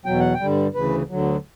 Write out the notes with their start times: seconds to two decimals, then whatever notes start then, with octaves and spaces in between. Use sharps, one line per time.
0.06 E2 B2 F#3 G5
0.20 F#5
0.34 G5
0.40 G2 D3 G3
0.74 D2 C#3 E3 B4
1.09 D2 D3 F#3